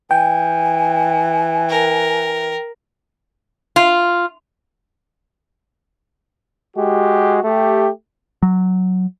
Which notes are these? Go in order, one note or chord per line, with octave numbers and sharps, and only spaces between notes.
E3 G5 G#5
A#4
F4
G#3 F#4 G4
A3 G4
F#3